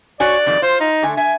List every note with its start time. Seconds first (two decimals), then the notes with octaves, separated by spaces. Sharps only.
0.20 F#4 C#5 D5 G#5
0.46 F2 D#3 G3
0.62 F4 C5
0.80 D#4
1.02 D3 A3 G#5
1.17 E5 G#5